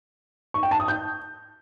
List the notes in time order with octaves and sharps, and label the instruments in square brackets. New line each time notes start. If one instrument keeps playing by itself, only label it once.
[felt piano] C#6
G5
A5
D#6
G6